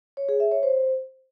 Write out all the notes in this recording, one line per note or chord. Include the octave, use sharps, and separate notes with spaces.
C#5
G#4
E5
C#5
C5